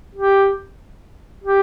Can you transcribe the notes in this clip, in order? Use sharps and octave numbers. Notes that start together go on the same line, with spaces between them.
G4
G4